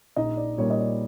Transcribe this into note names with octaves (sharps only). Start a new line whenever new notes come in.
A#1 D#4 D#5
D5
A#2 G3 A#3 C#5
D#5
D5